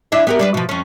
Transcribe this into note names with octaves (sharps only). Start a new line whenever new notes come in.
D4 E4 E5
B3 G4 A#4
G3 D4 B4
B2 F3
F2 C#4